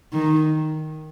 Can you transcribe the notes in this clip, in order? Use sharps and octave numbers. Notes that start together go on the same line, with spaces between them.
D#3